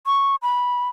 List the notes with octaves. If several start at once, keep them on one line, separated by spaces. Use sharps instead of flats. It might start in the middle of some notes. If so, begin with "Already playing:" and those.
C#6
B5